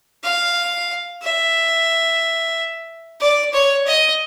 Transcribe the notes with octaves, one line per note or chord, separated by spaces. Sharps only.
F5
E5
D5
C#5
D#5